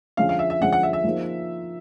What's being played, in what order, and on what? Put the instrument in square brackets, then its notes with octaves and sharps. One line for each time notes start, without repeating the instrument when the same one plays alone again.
[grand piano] D3 F3 G#3 C#4 [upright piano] F5
[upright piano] F5
E5
E5
[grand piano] D3 F3 G#3 C#4 [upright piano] F#5
[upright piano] F#5
E5
E5
[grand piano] F3 A#3 D#4 G#4 C5